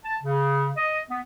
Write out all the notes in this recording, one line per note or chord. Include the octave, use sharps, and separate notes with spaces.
A5
C#3
D#5
B3